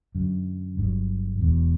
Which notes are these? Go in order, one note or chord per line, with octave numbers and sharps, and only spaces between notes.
F#2 D3 F#3
G1 G2 D3 F#3
E1 E2 B2